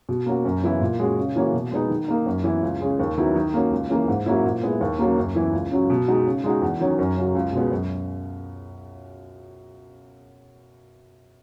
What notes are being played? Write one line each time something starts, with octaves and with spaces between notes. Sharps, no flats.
B2
A#3 C#4 F#4
F#2
C#3 E3 B3 E4
A#2
G#3 C#4 F#4
C#3
E3 A#3 C#4 F#4
B2
G#3 B3 D#4
D#3
A#3 D#4
F#2
E3 B3 E4
C#2
C#3 G#3
D#2
D#3 F#3 B3 E4
D#3
A#3 C#4 F#4
C#2
C#3 E3 A#3
G#2
F#3 A#3 C#4 E4
A#2
G#3 B3 E4
D#2
C#3 F#3 A#3
F#2
E3 B3 E4
C#2
C#3 F#3
B2
G#3 D#4 F#4
C#3
G#3 D#4 F#4
E2
D#3 F#3 C#4
F#2
C#3 F#3
C#2
B2 G#3 B3
F#2